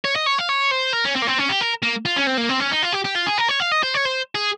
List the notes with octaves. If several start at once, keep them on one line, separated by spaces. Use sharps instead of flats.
C#5
D#5
C#5
F5
C#5
C5
A#4
C#4
C4
A#3
C4
C#4
G4
A#4
A#3
F4
C#4
C4
A#3
C4
C#4
D#4
F4
G4
G4
F4
G#4
A#4
C#5
F5
D#5
C5
C#5
C5
G#4